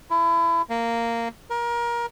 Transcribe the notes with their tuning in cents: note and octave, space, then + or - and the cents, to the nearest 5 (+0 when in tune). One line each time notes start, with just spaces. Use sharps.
E4 +30
A#3 -10
A#4 +25